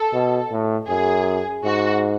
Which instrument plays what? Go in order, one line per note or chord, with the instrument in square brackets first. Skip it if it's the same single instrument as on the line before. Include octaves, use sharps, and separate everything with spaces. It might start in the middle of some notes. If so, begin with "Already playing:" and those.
Already playing: [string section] A4
[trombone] B2
A2
[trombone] F#2 [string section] G#4
[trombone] G#2 [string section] F#4